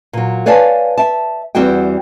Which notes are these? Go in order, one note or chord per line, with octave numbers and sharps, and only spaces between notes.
A#2 F#3
B4 C#5 D5 F5 G#5 A5
E5 A5
E2 G3 C4 E4 F#4 G5